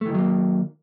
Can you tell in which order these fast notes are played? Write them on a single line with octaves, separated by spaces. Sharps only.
A3 E3 D#3 F#3 A#3